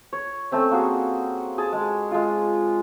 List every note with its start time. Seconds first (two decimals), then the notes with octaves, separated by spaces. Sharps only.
0.13 C#5
0.52 A3 C4 C#4
0.71 A#3 F#4 G#4
1.58 G#4 A5
1.72 G#3
2.11 G#3 F4